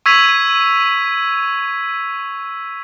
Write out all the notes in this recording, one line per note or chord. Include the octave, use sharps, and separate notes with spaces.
C#6 E6 G#6 B6 D#7 F7